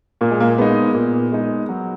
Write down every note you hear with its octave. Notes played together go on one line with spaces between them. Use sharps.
A#2 A#3
G#3
A#3
G#3 B3 D#4
A#2
G#3 D#4
F#3